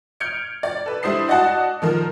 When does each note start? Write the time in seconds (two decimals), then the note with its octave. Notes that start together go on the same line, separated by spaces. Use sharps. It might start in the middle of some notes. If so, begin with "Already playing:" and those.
0.20 F6 G6 G#6 C#7 D7
0.63 D5
0.86 A4 B4
1.03 G3 D4 E4 C5 D#6 C7
1.28 F#4 D5 D#5 F#5 A5
1.82 D#3 F3 A#4